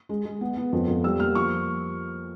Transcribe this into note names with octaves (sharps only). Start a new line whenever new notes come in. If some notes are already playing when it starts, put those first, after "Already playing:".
G#3
G#3
B3
B3
F2
F2
G3 E6
A#3 F6
F3 C#6